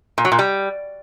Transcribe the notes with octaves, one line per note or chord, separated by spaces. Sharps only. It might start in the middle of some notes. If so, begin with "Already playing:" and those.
A#2
F#3
A#2
G3